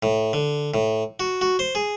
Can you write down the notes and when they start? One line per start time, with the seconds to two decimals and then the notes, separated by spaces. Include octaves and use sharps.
0.03 A2
0.33 D3
0.74 A2
1.20 F#4
1.41 F#4
1.59 C5
1.75 G#4